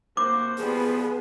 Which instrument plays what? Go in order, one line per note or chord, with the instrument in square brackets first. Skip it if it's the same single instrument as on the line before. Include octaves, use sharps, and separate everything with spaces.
[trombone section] C3 F#4 C5 [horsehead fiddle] A#3 [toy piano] D6
[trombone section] E3 F3 G3 [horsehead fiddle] B3 [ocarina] G#4